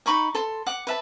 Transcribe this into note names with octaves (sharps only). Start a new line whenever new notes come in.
D#4 B5 C#6 D6
A4 C6
F#5 D6
B4 E5 A5